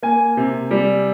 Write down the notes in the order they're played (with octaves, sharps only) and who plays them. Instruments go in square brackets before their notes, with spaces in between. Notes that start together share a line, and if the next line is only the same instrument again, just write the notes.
[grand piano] A#3 G#5
C3
G3